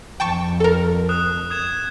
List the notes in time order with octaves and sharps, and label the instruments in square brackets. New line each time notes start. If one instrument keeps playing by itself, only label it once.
[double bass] F2 F3 [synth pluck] G5 A5 C#6
[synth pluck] A4 A#4
[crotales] D#6 F#6 E7
D#6 G#6 E7